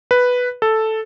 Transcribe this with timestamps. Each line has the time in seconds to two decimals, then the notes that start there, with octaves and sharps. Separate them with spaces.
0.11 B4
0.62 A4